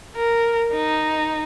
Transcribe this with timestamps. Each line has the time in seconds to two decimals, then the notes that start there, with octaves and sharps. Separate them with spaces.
0.16 A#4
0.73 D#4